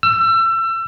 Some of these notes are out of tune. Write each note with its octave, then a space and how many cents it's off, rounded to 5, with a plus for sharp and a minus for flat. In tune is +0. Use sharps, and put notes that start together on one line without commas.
E6 +30